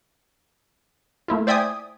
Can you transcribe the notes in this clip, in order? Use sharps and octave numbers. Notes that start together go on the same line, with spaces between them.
A3 A#3 E4 F4
C5 D5 E5 G5 G#5 D#6